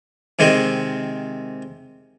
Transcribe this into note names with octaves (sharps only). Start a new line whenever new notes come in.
C3 D#3 G#3 C4